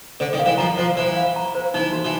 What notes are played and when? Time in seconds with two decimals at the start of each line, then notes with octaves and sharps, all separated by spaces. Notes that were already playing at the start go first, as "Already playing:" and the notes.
0.20 D3 C5
0.33 D#3
0.39 F5
0.46 E3
0.58 F3 A#5
0.77 F3 C5
0.96 E3 C5
1.16 F5
1.36 A#5
1.55 C5
1.74 E3 D#4
1.93 F#4
2.05 E3